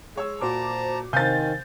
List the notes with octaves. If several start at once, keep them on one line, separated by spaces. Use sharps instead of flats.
G#3 C#5 E6
A#2 F#4 C5 A5 A#5 D6
C3 D#3 C5 F5 G#5 G6 A6